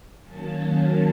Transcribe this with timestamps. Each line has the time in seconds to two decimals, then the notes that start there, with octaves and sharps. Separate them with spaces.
0.21 D#3 F#3 A#3 C#4 A5
0.55 A5